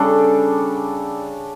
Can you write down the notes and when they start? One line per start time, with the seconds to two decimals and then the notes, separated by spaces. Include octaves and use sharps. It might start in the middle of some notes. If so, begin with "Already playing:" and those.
Already playing: C#3 G3 D4 A4